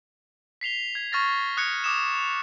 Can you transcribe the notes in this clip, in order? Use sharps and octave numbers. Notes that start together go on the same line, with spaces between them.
B6 C7 F7 G7
G#6
C#6 F6 A6 A#6
D#6 F#6 G#6 C#7
D6 D#6 E7